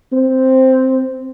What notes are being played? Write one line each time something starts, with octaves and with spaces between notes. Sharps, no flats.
C4